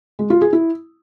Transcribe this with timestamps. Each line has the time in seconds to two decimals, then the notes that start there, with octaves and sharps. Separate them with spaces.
0.19 G#3
0.30 F4
0.41 G#4
0.53 E4